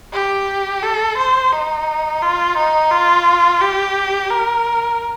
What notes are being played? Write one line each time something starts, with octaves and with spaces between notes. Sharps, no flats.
G4
A4
C5
D#4
F4
D#4
F4
G4
A#4